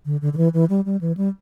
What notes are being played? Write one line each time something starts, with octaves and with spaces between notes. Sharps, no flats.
D3
D3
D3
E3
E3
G3
G3
E3
G3